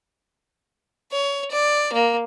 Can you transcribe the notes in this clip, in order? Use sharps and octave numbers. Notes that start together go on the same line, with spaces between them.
C#5
D5
A#3